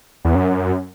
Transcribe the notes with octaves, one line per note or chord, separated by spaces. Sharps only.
E2
F#2